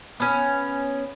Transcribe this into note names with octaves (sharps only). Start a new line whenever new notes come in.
B3 C#4